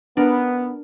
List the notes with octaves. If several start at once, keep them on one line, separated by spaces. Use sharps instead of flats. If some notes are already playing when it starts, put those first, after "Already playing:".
B3 D4 A#4